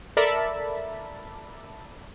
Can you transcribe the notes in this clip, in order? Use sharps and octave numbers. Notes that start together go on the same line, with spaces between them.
A4 A#4 D5 E5 A5 B5